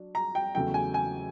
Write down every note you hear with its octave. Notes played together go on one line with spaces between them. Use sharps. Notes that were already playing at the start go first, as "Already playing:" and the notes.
Already playing: F#3 D4
A#5
G5
E2 C#3 F#3 A3 G5
G#5
G#5